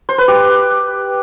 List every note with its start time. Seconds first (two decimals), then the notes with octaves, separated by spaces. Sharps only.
0.09 C5
0.18 B4
0.28 G4